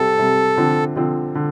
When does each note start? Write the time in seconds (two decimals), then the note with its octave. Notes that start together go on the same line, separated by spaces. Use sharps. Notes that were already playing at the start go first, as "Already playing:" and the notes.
Already playing: C3 G3 C4 A4
0.19 C3 G3 C4
0.57 D3 F3 C4
0.96 D3 F3 C4
1.35 D3